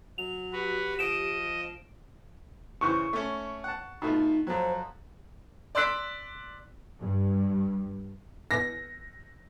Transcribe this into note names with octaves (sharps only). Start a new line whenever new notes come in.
F#3 F7
F#4 G4 B4
F3 D#5 D7 E7
C#3 E3 C5 C#6
A3 C#4
F#5 A5
B2 A3 D#4 F4
F2 F#3 C5
D5 C6 E6 F#6 B6 D7
G2
A#6